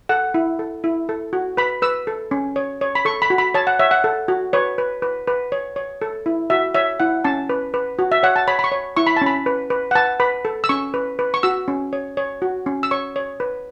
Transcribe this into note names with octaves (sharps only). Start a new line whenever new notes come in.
A4 F#5
E4
A4
E4
A4
F#4
B4 B5
B4 E6
A4
C#4
C#5
C#5
B5
A4 C#6
B5
F#4
B5
C#5 A5
F#5
C#5 E5
F#5
A4
F#4
B4 C#5
B4
B4
B4
C#5
C#5
A4
E4
F#4 E5
C#5 E5
E4 F#5
C#4 A5
B4
B4
F#4
E5
C#5 F#5
A5
C#5 B5
B5
C#6
C#5
E4 C#6
B5
A5
C#4 B5
B4
B4
F#5
B4 A5
B4 B5
A4
E6
C#4 C#6
B4
B4
C#6
F#4 E6
C#4
C#5
C#5
F#4
C#4
E6
C#5 C#6
C#5
B4